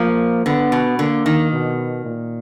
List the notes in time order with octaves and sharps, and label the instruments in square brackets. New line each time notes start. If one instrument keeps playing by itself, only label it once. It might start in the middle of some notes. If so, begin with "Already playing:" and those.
Already playing: [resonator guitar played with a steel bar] F3 [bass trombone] A#3
[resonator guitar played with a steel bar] D3 [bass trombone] B3
[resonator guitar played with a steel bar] B2
[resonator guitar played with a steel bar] D3 [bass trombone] A#3
[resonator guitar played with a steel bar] D#3
[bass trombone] B2
A#2